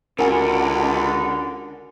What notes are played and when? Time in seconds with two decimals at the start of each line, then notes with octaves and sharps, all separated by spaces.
0.19 C#2 D3 C#4 F#4 A#4 F#5 G#5